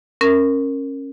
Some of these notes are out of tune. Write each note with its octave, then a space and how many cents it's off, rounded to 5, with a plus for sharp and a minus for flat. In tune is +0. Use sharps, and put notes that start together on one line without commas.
C#4 -20 A#4 -10